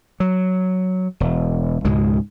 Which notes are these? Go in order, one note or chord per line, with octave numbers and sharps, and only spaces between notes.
F#3
E1
C#2 G#2 B2 G#3